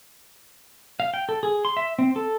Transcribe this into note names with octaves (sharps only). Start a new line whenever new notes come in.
F5
G5
A4
G#4
C6
E5
C4
A4